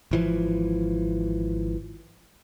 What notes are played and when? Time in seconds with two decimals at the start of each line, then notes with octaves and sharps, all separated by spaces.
0.11 G#1 E3 F3